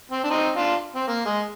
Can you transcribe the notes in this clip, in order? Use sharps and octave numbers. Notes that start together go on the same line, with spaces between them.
C4
D4
C4 D#4
D4 F4
C4
A#3
G#3